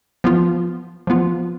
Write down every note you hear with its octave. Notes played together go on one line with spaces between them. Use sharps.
F3 B3 F4
F3 B3 F4